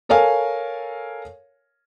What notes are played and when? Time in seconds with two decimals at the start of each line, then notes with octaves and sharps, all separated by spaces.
0.09 A4 A#4 C#5 F5 G#5